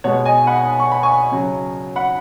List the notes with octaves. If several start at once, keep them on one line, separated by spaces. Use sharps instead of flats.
B2 G#3 C#5 F#5
D#5 G#5
F#5 B5
C#6
B5
G#5 C#6
C#3 F#3
F#5 B5